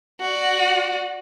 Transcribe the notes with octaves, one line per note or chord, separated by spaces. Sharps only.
F#4 D5